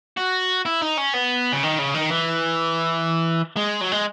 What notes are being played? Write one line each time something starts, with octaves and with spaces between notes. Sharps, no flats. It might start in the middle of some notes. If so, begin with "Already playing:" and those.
F#4
E4
D#4
C#4
B3
C#3
D#3
C#3
D#3
E3
G#3
F#3
G#3